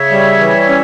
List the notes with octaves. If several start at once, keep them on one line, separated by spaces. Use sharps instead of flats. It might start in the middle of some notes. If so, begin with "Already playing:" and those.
Already playing: C#3 C#5 E5
G3
E3
C#4